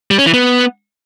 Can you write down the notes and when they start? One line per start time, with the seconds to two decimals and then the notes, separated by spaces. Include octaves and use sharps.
0.11 G3
0.18 C#4
0.26 E3
0.34 B3